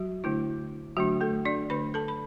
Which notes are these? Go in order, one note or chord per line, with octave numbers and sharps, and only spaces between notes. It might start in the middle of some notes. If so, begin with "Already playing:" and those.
Already playing: F#3 F#4
D3 A3 D4 E4
D3 F#3 A3 D4 F#4
A3 A4
D4 D5
D3 A3 D4 B4 B5
A4 A5
B5